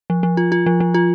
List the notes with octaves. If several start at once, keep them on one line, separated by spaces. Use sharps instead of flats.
F3
F3
F4
F4
F3
F3
F4